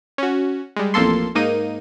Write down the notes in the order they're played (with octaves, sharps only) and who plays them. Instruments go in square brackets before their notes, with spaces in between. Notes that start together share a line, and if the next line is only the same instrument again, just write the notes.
[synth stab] C#4 F#4
G3 G#3
A1 F2 A#3 A4 C6
G#2 A#3 D#4 D#7